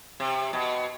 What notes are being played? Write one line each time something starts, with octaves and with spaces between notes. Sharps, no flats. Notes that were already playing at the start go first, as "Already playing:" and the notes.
C3
B2